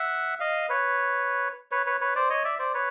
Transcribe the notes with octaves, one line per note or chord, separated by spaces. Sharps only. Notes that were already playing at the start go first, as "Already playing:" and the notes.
Already playing: E5 F#5
D#5 F5
B4 C#5
B4 C#5
B4 C#5
B4 C#5
C5 D5
C#5 D#5
D5 E5
C5 D5
B4 C#5